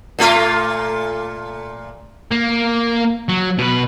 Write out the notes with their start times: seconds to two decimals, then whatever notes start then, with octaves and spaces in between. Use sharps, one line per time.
0.19 A#2 A3 F4
2.31 A#3
3.29 F#3
3.58 B2 B4